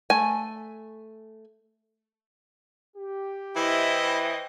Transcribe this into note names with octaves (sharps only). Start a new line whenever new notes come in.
A3 G#5
G4
E3 E4 C5 D#5 G5